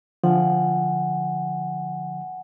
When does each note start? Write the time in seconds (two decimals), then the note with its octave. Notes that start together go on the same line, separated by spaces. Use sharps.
0.24 D3 F3 F#5 G#5